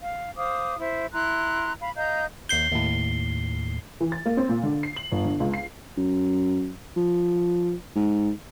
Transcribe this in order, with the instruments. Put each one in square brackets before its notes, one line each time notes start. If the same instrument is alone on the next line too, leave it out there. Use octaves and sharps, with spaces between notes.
[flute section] F5
C5 F5 D6 D#6
E4 C5 E5
E4 A#5 C6 F#6
F5 B5
D#5 F5 A#5 G6
[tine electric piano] D#2 G6 [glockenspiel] C7 G7
[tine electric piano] D#2 A2
[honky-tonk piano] E3
A6
A#3
C4
A#2
D3
C7
F#7
G1
D3
C#2
C7
[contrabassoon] F#2
F3
G#2